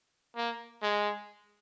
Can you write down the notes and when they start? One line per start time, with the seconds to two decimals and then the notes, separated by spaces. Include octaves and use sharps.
0.37 A#3
0.83 G#3